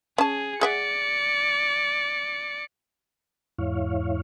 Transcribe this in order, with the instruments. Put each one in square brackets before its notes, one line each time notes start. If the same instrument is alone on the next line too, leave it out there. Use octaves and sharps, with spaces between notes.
[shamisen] C#4 A5 [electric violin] G#4
[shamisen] G#4 E5 F#5 [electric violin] D5 C#7
[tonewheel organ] E2 G#2 E4 C#5 F5